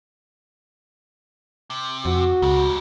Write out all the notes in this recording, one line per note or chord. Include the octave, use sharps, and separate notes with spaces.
C3
F2 F#4
C#2 G#2 G3